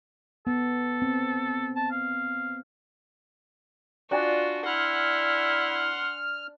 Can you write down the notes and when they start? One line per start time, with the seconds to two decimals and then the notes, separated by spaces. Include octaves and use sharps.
0.47 B3 A4
1.02 C4
1.76 A5
1.91 F5
4.11 D4 F4 F#4 G#5
4.66 E4 F#5 C6 F6